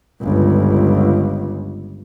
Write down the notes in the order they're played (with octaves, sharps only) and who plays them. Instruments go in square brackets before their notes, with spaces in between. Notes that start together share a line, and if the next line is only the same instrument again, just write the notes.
[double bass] G1 C#2